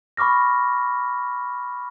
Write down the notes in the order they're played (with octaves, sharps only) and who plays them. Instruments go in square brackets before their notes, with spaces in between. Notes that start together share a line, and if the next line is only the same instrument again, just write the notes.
[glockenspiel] B5 C#6 D6 F6 A#6